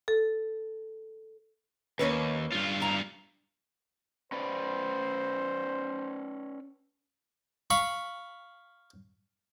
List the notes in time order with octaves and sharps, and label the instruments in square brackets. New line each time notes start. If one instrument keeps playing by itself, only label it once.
[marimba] A4
[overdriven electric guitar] D#2 [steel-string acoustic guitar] A#3 C#4 B4
[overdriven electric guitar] G2 F4
[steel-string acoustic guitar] E4 A#5
[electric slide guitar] C#4 B4 D5 [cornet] C5
[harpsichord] F5 B5 C#6